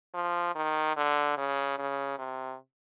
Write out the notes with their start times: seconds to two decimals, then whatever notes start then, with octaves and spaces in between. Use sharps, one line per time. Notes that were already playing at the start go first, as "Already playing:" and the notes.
0.14 F3
0.55 D#3
0.96 D3
1.37 C#3
1.78 C#3
2.19 C3